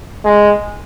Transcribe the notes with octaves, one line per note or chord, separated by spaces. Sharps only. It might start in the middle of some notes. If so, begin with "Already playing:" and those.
G#3